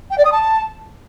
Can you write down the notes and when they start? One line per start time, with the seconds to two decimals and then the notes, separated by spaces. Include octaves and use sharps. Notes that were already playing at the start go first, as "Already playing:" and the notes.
0.11 G5
0.18 D5
0.25 D#6
0.32 A5